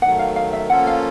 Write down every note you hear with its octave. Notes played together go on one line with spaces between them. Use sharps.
D#3 F#3 A3 F#5
F5
F5
E5
F3 A#3 C#4 F4 A4 F#5
F5